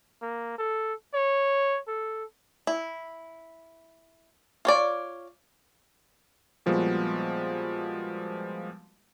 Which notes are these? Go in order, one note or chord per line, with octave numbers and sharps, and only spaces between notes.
A#3
A4
C#5
A4
E4
F4 C#5 D5
A#2 F3 G3 G#3 B3 F#4